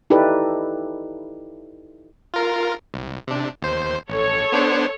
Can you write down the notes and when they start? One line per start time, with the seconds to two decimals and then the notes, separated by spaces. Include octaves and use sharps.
0.10 D#4 E4 G4 A4 B4 D5
2.34 F4 A#4
2.94 C2
3.27 C3 D4
3.62 D#2 C5
4.10 A1 A4 C#5
4.52 B3 D4 C5